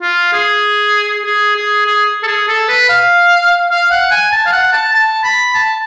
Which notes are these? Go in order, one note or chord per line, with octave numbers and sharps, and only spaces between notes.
F4
G#4
G#4
G#4
G#4
A4
G#4
A4
B4
F5
F5
F#5
G#5
A5
F5
F#5
A5
A5
B5
A5